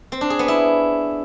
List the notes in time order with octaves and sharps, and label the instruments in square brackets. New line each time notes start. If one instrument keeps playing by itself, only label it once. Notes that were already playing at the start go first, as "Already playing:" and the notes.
[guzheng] C4
D4
G#4
B3
E4